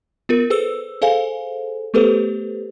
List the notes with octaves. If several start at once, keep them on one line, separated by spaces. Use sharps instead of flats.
B3 F4 A#4
G#4 A4 B4 C5 E6
G#4 A4 C5 F5 G#5
A3 B3 G4 A4 B4 C5